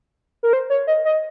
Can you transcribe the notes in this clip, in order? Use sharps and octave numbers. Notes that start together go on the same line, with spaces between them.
A#4
C5
C#5
D#5
D#5